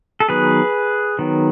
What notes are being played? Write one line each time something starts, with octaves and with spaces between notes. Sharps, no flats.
A4
D#3 F#3 B3 G#4 B4
D#3 F#3 B3